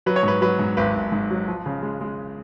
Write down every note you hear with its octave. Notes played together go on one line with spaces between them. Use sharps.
F#3 B4
C#5
G#2 B4
F#3 B4
G#2
G#1 B4
G#1
G#2
F#3
F3
C#3
G#3
G#3